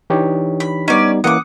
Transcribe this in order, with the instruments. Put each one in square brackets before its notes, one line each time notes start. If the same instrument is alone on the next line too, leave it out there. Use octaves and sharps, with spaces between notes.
[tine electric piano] E3 D#4 [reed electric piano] D4 G4 C#5
[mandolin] B5
[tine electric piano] G3 B3 D#4 [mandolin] C#4 D5
[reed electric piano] E3 A#3 C#4 [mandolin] F#5 D6 [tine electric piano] D#6